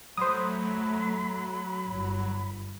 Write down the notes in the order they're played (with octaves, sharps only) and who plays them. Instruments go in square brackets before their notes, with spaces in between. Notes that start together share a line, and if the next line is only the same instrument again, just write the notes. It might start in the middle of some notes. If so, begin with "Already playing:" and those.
[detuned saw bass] F#3 [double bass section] A3 [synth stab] C5 D#6 [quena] B5
[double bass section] G1